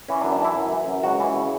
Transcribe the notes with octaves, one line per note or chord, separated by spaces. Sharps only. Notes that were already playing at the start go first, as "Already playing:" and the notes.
E3 C#4
D4
F#2
D4
E3 E4
F#2
E3
F#2
C#2 F#4
E3
C#3